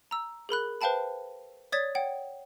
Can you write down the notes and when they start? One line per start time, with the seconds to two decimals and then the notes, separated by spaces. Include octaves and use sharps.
0.11 A#5 E6
0.49 G#4 A#4 B5 F#6
0.81 B4 C5 F5 G5 A5 B5
1.72 C#5 D5 D#6 G#6 A6 B6
1.95 C#5 F#5 G5